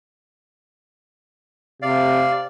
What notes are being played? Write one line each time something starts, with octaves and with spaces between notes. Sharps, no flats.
C3 D5 F5